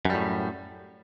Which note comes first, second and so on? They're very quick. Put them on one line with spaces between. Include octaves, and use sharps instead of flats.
F#2 G3 A2